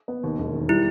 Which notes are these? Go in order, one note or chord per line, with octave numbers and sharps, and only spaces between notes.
B3
D#2
E1
D#3
G3 E4